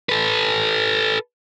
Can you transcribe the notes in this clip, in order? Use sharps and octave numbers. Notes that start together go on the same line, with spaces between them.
A4 B4